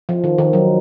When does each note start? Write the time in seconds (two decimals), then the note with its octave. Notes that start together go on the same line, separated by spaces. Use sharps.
0.09 F3
0.24 D#3
0.38 D#3
0.53 F#3